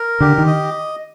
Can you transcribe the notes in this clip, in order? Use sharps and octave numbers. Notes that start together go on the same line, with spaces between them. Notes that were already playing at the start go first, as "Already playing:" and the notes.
Already playing: A#4
D3 G4
D#3
D#5